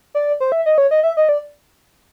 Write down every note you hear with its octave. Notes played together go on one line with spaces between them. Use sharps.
D5
C5
E5
D#5
C#5
D#5
E5
D#5
D5